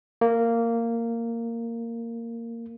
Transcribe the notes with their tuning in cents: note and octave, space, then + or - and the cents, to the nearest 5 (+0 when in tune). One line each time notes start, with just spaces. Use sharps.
A#3 -10